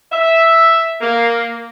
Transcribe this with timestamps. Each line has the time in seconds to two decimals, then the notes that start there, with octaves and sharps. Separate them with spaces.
0.11 E5
1.01 A#3